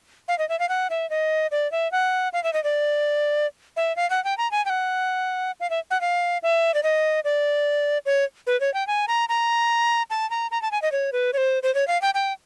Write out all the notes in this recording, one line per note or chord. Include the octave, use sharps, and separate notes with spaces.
F5
D#5
E5
F5
F#5
E5
D#5
D5
E5
F#5
F5
E5
D#5
D5
E5
F5
F#5
G5
A#5
G#5
G5
F#5
F5
E5
F#5
F5
E5
D5
D#5
D5
C#5
B4
C#5
G5
G#5
A#5
A#5
A5
A#5
A#5
A5
G#5
D#5
C#5
B4
C#5
C5
C5
C#5
F5
G5
G5